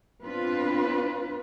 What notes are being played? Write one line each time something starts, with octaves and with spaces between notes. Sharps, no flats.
B3 C4 D4 F4 B4 C5